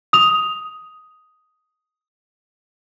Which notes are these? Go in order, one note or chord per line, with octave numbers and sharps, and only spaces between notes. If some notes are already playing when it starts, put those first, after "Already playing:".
D#6 F7